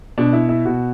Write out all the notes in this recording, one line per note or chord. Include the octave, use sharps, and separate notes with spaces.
B2 D4
E4
E4
B2 F#4